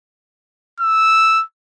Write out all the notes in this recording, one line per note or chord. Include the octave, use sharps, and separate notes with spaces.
E6